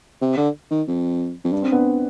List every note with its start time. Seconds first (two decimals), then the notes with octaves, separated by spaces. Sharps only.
0.21 C3
0.37 D3
0.71 D#3
0.87 F2
1.44 F2
1.53 G2 D4
1.62 C4
1.72 B3 D4